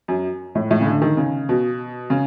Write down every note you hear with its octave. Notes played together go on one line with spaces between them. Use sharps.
F#2
A2
A2
C#3
D3
D#3
C#3
B2
C#3